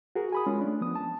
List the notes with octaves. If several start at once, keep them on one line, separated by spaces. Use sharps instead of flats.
F#4 G#4 A#4
G#5 B5 D#6
G#3 C#4 F4
A3 D4
F3 B3 D#6
A5